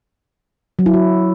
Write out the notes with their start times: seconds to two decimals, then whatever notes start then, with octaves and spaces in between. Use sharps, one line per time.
0.79 F#3
0.86 E4
0.94 F#4